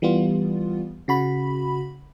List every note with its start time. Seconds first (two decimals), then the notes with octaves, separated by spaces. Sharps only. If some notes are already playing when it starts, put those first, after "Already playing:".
0.02 E3 G3 B3 F4
1.08 C#3 F#4 B5